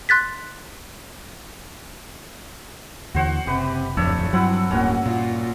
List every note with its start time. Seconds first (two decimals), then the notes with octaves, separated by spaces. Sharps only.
0.09 C6 F#6 A6 B6
3.14 D#2 D3 E3 F#4 C5 F#5
3.47 F#1 C3 G4 B4
3.97 D1 F2 F3 D4 C#5 E5
4.33 G2 F#3 C4 E4 F#5
4.71 D1 A#3 C#4 F#4
5.06 A#2 F4